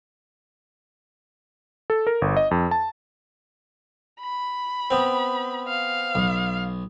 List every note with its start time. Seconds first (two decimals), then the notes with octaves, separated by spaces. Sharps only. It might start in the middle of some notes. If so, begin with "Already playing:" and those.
1.90 A4
2.07 A#4
2.22 G1
2.37 D#5
2.51 F2
2.71 A5
4.21 B5
4.91 B3 C4
5.68 F5
6.15 B1